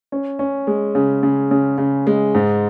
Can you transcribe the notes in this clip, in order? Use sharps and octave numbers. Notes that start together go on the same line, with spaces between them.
C#4
C#4
G#3
C#3
C#3
C#3
C#3
G#3
G#2